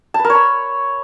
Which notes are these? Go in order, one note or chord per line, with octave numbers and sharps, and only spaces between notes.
A5
B4
A#4
C#5
B5